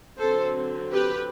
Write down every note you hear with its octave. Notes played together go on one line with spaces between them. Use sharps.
D3 F#3 C4 A4 C5
G4 B4